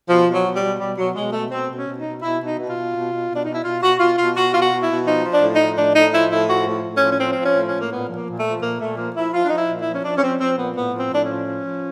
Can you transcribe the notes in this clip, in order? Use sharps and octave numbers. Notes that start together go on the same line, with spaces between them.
B2 F3
B2
F#3
B2
G3
B2
B2 G3
B2 F#3
B2 G#3
B2 A3
B2 C4
B2
C#4
B2
D#4
B2
B2 E4
B2
D#4
B2
F4
B2
B2
B2
B2
D4
B2 D#4
E4
B2 F4
B2 F#4
B2 F4
B2 F4
B2 F#4
B2 F4
F#4
B2
E4
B2
F3 D#4
F3
D4
A2
D#4
F3
A2 D4
A2 D#4
F3 E4
A2 E4
F3 F#4
A2
A2
C#4
F3
C#4
F3 C4
C4
F3
C#4
A2
A2 C#4
A#3
A#2 B3
F3
A#3
A#2
A3
F3
A#2 A#3
A#2 A3
F3 A#3
F3 E4
F3 F4
D4
F3 D#4
E4
A#2
E4
F3
C#4
F3 D4
C#4
F3 C4
F3 C4
A#2 B3
A2 B3
F3
C4
A2 D4
C#4
F3
F3
F3